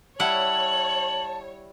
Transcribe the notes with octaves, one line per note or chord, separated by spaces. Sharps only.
G3 E4 C#5 F#5 A5 F#7